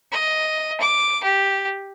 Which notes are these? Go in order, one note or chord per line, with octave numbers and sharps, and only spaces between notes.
D#5
D6
G4